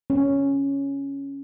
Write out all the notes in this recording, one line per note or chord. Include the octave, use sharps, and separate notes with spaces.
C#4